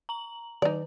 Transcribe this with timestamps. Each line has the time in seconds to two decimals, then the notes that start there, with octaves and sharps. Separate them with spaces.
0.09 A#5 F#7
0.62 D#3 D#4 D5